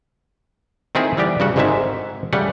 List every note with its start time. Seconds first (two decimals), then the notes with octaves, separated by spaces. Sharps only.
0.95 D#3 A3 C4 E4 G#4
1.17 E3 G3 B3 G4 D5
1.40 G2 C#3 F#4 F#5
1.56 G#1 G#2 D3 D#3 G#3 E5
2.33 C#3 G3 A3 F#5